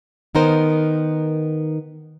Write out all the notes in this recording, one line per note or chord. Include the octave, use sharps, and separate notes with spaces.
D#3 B3 D#4 A#4 C5